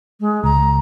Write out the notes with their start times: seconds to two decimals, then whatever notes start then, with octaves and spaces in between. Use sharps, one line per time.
0.20 G#3
0.44 C#2 A#5